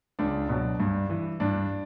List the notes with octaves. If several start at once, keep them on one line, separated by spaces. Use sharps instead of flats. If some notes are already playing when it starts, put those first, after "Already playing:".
C#2 D4
B2 F#3
G2
E3
G2 D4